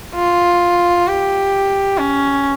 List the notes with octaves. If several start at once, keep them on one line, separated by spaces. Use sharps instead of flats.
F4
G4
C#4